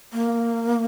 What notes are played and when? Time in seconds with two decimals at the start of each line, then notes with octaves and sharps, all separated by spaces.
0.13 A#3